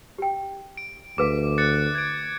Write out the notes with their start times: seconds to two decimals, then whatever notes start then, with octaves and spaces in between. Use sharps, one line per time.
0.18 G4 G5
0.77 D7
1.18 D2 G#4 B4 F5 D6
1.58 F#6 A6 C#7
1.95 G#6 D7